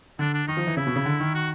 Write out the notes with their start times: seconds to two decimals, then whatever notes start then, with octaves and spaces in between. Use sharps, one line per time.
0.19 D3 D4
0.34 D4
0.47 D#3 D#4
0.57 F3
0.67 E3
0.77 C#3 E4
0.87 B2
0.96 C#3
1.05 D3
1.20 D#3
1.35 F#4